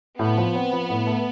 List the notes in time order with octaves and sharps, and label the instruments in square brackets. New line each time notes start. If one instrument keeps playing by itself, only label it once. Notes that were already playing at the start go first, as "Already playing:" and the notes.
[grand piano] A2 [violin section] B3
[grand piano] F3
C4
F3
A2
A3